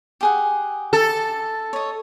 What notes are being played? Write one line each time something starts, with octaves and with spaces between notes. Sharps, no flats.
G4 G#4 F#5
A4
C#5 D#5